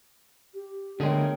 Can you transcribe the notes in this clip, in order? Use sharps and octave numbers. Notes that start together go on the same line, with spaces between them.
G4
D2 D3 G#3 B3 G#4 A#4 C#5 G5